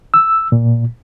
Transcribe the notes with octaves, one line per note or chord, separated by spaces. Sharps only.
E6
A#2